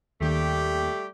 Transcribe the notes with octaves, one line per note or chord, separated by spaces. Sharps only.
D#2 D#3 G3 A3 A#3 G4